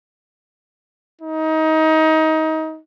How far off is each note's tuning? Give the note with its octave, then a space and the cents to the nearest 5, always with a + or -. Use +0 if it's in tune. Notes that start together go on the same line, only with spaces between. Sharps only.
D#4 +25